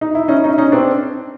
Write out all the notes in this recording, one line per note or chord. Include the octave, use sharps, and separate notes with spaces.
D#4
E4
C#4 D#4
C#4 D#4
C#4 D#4
C4 D4